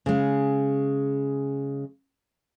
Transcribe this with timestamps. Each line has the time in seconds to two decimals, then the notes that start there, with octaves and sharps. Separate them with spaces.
0.06 C#3 G#3